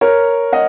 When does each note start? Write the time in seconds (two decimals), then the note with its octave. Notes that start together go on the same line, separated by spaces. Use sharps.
0.01 A#4 C#5
0.53 D#5 F#5